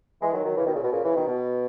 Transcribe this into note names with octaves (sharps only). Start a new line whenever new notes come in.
E3 G#3
D#3 F#3
D#3 F#3
C#3 E3
B2 D#3
A#2 C#3
B2
A#2 C#3
C#3 E3
B2 D#3
B2